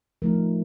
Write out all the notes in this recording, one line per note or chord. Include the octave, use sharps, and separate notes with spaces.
F3 A3 D#4 A#4